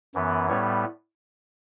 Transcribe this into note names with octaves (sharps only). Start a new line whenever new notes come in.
F#2 E3 B3
A2 G3 B3 C#5